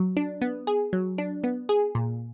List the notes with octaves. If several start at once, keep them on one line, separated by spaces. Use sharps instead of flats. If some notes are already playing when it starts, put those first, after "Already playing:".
Already playing: F#3
D4
B3
G#4
F#3
D4
B3
G#4
A#2